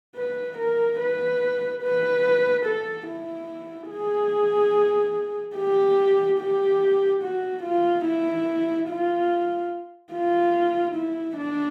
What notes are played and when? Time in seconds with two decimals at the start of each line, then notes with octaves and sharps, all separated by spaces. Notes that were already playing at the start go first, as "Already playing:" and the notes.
0.16 B4
0.58 A#4
1.00 B4
1.83 B4
2.66 A4
3.07 E4
3.90 G#4
5.56 G4
6.39 G4
7.23 F#4
7.64 F4
8.05 E4
8.89 F4
10.13 F4
10.95 E4
11.38 D4